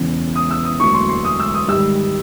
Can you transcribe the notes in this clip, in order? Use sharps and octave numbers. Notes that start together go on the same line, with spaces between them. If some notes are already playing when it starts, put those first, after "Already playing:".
Already playing: E1 E2 C#3 E3
D#6
E6
D#6
E1 D2 D3 F#3 A#3 C#6
C6
C6
D#6
E6
D#6
G#2 D#3 G3 E6